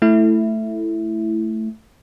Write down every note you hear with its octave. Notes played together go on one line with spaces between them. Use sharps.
A3 E4